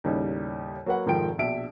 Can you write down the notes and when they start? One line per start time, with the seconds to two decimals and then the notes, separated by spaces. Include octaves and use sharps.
0.04 D#2 A2 C#3 G3 D#4
0.86 F#3 A#3 F#4 B4 F#5
1.06 F1 G#2 D#3 F3 G5 D7
1.38 A#1 B2 D4 E5 D7